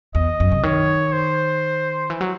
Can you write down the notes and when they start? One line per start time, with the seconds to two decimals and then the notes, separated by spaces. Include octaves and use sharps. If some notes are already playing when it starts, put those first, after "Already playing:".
0.15 E2 D#5
0.40 F#2
0.52 C3
0.63 D#3 C#5
1.13 C5
2.10 E3
2.21 F#3